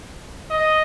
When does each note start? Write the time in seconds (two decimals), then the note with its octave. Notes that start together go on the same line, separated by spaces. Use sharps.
0.51 D#5